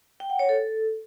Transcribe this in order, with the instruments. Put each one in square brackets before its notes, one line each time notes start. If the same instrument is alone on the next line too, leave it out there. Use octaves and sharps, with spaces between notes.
[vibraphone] G5
F#5
C#5
A4